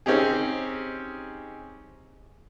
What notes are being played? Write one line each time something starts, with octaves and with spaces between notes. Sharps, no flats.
C4 C#4 D#4 G4 G#4